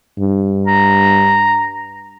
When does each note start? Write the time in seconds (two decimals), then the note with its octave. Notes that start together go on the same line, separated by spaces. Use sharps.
0.19 G2
0.67 A#5